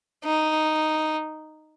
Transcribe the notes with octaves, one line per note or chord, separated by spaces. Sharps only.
D#4